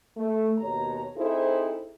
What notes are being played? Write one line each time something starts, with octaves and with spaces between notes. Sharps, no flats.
A3
D#2 B2 C#5 A#5
C4 D#4 E4 G#4 A4 C5